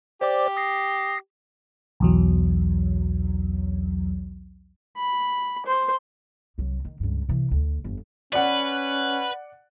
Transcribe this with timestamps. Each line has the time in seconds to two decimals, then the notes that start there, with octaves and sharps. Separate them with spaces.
0.21 G4 C5 D5 D6
0.57 D#6 A#6 C7
2.00 B1 E2 F#3
4.97 B5
5.66 C5
6.58 C2 F#3
6.85 D#3
7.00 C#2 G2
7.28 C3 E3
7.51 D2
7.84 G1 F2
8.33 C#4 B4 D5 F#5